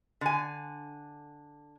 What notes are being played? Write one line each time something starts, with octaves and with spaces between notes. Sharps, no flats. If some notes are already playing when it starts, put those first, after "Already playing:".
D3 G#5